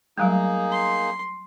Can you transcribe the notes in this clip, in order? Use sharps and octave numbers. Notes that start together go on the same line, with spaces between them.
F#3 G3 A3 A#3 D#4 G#4
C6